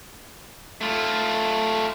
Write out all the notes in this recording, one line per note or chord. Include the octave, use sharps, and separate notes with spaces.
A3 F4